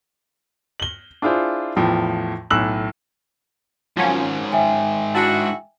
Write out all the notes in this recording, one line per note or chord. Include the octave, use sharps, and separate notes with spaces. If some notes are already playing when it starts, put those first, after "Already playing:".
F#7 G7
D4 E4 F4 G#4 C5
E2 A2 F3 G5
B1 A2 G#5 E6 F#6 F#7
G#2 D#3 F3 F#3 C#4
E5 G5 G#5
D4 E4 F#4 A5